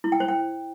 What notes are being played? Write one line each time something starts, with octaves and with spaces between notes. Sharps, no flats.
E4
G5
C5
G5